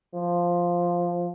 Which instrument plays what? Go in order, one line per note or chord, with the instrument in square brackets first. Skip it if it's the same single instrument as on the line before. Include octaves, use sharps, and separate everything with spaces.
[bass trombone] F3